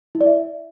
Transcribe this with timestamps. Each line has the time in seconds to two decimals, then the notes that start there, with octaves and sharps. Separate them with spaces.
0.15 E4
0.21 D5
0.26 E5